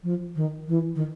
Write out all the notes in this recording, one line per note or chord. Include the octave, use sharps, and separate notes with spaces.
F3
D#3
E3
D#3